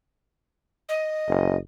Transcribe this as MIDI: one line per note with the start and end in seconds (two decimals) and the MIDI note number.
0.88 1.56 75
1.28 1.57 30